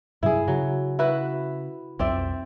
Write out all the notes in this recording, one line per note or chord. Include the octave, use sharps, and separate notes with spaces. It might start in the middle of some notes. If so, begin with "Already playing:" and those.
G2 C3 F#3 E4 G#4
C#3 F#3
E4 F#4 B4
B1 F2 C4 D5 E5